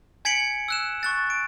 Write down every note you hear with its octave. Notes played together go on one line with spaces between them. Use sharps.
G#5 G#6 B6 C#7 D7 F#7
E6 F#6 E7
C#6 F#6 A6
D7